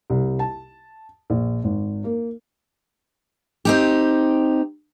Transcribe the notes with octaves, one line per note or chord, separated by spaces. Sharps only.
C2
A5
A#1
G#1
A#3
C4 D#4 G4